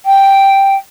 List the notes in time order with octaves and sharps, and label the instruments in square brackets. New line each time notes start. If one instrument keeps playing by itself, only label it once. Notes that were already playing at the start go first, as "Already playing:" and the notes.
[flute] G5